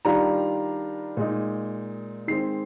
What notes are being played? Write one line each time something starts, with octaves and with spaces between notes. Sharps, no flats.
D#3 G3 D4 F4 A#5
A#2 G#3 D#4
D#3 G#3 C4 C7